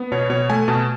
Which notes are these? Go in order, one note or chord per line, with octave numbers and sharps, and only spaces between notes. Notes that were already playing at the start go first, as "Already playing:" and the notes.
Already playing: B3
B2 C#5
B2 C#5
A3 G#5
B2 A5